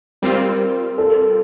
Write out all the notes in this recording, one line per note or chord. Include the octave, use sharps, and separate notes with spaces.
G3 C4 F4 A#4
A4